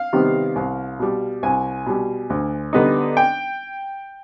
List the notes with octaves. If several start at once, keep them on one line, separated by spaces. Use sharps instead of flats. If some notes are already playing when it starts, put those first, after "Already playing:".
Already playing: F5
C3 D#3 G3 B3
C2
B2 G3
C2 G#5
B2 G3
D2
D3 G3 B3 D#4
G5